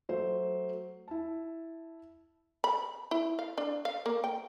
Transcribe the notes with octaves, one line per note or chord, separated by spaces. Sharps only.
F#3 A3 C5
E4 A5
B5
E4
F5
D4
F5
A#3
G5